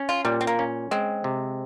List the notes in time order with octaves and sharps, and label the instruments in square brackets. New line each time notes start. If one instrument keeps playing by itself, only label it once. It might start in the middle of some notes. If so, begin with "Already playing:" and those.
Already playing: [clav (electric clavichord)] C#4
[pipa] F4
[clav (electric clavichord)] A#2 [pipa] G3
[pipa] C4
A#3
[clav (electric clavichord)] C#4
[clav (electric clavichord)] G#3 [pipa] C4
[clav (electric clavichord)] C3